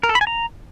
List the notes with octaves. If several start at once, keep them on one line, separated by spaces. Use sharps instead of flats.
A#4
A4
B5
G#5
A#5